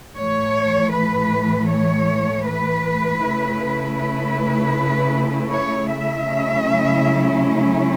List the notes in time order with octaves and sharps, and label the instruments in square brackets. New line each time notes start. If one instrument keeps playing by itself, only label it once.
[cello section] A2 E3 A3 C#5
B4
C#5
B4
C#3 A3 E4
B4
C#5
E5
C#3 F#3 A3 C#4 E4